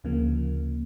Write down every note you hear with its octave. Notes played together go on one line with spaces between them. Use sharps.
D2 C#3 F3 A#3